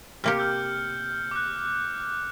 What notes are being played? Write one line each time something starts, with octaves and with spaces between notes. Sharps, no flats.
C3 A#3 G4 F6 C#7
E6 F6 G6
D6 F#6